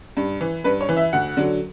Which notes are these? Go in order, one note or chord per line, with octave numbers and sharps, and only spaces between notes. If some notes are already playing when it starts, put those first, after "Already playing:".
G2
E3
G2 B4
C#5
E3
E5
D2 F#5
D3 F#3